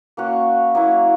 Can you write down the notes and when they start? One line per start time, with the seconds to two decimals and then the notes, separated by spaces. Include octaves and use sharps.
0.17 A#3 C#4 F#4
0.75 F#3 A#3 E4